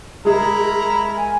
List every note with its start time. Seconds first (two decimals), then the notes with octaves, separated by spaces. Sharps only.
0.25 G#3 E4 G#4 A#4 A#5
1.15 G#5